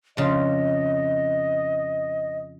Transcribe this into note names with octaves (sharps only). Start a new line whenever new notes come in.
F2 C#3 F4 D#5